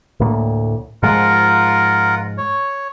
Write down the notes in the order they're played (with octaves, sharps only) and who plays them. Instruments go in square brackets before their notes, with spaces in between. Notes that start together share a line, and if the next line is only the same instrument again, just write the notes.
[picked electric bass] D2 A2 A#3
[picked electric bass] G#2 F3 G#3 [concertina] F4 A#4 F#5
[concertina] C#5